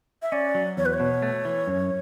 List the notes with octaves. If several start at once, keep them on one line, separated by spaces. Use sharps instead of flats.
E5
C#4 D5
F#3
E2 C#5
B4
C#5
B2
A3
E3
F#2